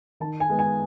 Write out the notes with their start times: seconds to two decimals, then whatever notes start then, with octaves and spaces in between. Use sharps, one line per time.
0.20 D#3 A5
0.40 G#5
0.49 G#3 B3
0.59 G#5